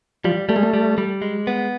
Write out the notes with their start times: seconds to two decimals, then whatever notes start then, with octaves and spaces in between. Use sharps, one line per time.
0.24 F3 G3
0.49 G3 A3
0.56 G#3
0.63 A3
0.74 G3
0.98 G3
1.22 G#3
1.47 B3